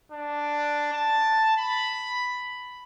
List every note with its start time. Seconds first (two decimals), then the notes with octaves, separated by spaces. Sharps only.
0.12 D4
0.93 A5
1.57 B5